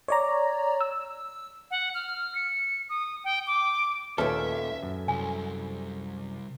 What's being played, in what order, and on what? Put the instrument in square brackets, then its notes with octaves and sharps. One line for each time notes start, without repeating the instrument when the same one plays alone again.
[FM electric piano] C#5 D5 A#5
E6
[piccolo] F#5
F6
C#7
D#6
G5
D6
[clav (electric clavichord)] D#2 A#2 [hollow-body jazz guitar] A3 C#4 A4 [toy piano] B4 [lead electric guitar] E5
[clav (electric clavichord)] F#2
[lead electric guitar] C2 [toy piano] G#5